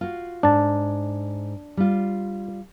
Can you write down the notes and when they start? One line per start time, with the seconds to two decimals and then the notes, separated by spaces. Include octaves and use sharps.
0.01 F4 F#4
0.43 G#2 D4 A5
1.77 G3 F4